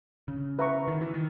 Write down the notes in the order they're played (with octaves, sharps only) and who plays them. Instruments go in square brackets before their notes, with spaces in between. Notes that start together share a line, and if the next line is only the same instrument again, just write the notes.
[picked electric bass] C#3
[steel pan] B4 E5 A#5 C#6
[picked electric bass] D#3
E3
D#3